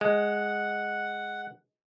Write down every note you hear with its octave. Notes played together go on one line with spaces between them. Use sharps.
G#3 F#5